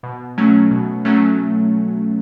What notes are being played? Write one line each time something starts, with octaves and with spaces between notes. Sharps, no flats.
B2
F#3 A3 C#4
B2
F#3 A3 C#4